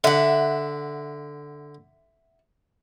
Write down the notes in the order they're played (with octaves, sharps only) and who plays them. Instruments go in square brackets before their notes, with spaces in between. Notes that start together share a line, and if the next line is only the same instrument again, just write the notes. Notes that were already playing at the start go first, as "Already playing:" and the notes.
[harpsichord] D3 [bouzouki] E5 F#5